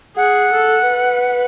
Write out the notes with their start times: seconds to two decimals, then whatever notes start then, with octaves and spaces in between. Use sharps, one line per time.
0.17 G#4 F#5
0.53 A4
0.90 B4